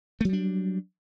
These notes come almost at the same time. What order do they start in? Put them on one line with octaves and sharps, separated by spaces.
A3 F#3 G3 D4